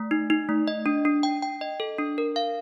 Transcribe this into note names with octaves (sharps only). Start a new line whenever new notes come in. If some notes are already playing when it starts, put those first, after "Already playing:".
Already playing: A3
D#4
D#4
A3
D#5
D4
D4
G5
G5
D#5
A4
D4
A#4
F5